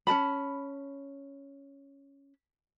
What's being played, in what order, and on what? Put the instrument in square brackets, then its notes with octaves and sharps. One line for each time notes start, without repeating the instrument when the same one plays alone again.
[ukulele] C#4 B4 A5 B5